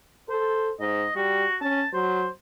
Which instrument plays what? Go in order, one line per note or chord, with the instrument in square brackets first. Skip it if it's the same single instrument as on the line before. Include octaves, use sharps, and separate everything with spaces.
[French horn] A4 [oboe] C5
[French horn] G#2 [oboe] D#5
[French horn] G3 [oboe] F#4
[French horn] C#4 [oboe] A5
[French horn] F#3 [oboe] C5